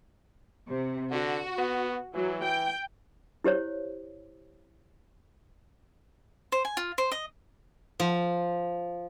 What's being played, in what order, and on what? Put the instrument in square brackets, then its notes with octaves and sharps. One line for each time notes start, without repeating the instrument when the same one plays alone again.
[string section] C3
[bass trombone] D3 [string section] F#4
[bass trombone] B3
[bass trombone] E3 [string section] F#3
[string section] G5
[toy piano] E4 G4 C5 C#5
[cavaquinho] C5
G#5
F4
C5
D#5
[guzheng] F3